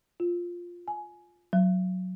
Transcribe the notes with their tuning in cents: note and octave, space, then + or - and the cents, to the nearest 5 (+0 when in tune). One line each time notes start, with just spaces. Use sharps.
F4 +5
G#5 +15
F#3 -5